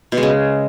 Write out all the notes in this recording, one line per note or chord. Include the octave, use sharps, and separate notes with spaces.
B2
G#3
C#3